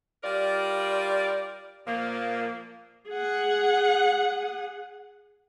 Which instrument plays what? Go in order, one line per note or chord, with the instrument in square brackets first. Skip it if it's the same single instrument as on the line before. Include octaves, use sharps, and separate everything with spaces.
[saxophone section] G3 F4 A#4 D5
A#2 F3 A#3
[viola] G#4 F#5